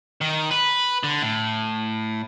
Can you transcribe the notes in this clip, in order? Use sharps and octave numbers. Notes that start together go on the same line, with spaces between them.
D#3
B4
D3
A2